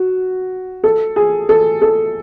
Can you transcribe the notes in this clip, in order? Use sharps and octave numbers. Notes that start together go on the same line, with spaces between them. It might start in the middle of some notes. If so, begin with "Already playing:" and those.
Already playing: F#4
A4
G#4
A4
A4